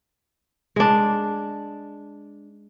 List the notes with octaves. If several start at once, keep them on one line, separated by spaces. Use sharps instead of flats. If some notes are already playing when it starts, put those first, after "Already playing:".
G#3 D4